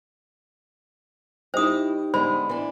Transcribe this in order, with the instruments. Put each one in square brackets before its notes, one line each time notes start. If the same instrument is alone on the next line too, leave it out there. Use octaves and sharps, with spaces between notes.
[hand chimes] D#4 G4 G5 [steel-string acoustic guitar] E4 D#5 [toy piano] C5 D#6
[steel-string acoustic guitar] D3 G#3 B3 [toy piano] C5 [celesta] B5
[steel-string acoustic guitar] E3 D4